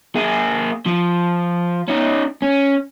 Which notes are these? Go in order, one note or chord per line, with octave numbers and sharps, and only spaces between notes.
A#3 G#4
F3
C#4 D#4
C#4